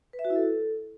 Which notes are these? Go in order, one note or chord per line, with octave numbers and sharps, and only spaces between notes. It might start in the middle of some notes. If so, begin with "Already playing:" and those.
B4
E5
F#4
E4
A4